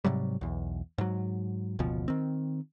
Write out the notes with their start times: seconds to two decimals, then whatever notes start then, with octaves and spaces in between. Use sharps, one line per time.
0.05 G#2 C3 F#3 G3
0.41 B1 E2
0.98 G#2 F#3
1.79 F#1 D2 B2 F3
2.08 D#3 C4